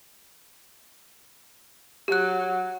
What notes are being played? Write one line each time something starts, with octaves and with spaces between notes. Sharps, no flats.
F#3 G4 F#6